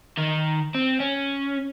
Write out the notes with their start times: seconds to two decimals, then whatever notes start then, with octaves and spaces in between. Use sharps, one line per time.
0.17 D#3
0.74 C4
1.00 C#4